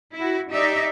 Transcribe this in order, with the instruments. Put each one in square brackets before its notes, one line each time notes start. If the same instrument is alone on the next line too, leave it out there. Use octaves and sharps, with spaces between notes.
[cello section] E4 F#4
D#4 G4 D5 E5